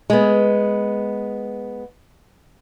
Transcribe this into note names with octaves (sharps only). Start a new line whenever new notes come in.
G#3 B3